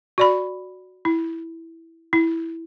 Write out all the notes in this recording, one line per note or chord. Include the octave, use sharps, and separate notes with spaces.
F#4 D5 B5
E4
E4